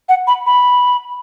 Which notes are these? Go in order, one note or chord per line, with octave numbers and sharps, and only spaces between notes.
F#5
B5
B5